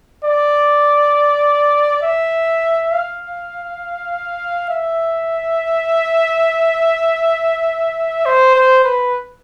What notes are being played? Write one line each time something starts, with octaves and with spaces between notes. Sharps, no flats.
D5
E5
F5
E5
C5
C5
B4